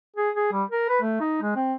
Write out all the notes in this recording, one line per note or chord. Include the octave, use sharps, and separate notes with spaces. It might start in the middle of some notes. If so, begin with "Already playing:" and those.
G#4
G#4
G3
A#4
B4
A3
D#4
G#3
C4